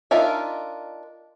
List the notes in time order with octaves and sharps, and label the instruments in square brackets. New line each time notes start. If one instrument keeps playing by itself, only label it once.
[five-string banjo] D4 D#4 F4 A#4 E5